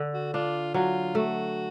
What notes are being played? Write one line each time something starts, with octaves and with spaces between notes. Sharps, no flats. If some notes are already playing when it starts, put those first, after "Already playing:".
Already playing: D3
F#4
D4 F4
F#3 F4
A3 F#4